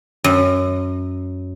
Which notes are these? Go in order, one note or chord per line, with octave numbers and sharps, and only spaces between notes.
F#2